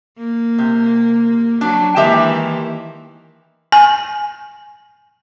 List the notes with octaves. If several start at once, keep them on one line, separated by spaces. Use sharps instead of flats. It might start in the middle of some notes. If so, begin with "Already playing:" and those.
A#3
C3
F#3 D4
D#3 E3 G#3 A#3 G4 E5
G#5